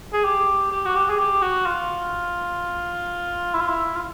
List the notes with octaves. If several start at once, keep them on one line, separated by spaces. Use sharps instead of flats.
G#4
G4
G4
F#4
G4
G#4
G4
F#4
F4
E4
F4
E4
F4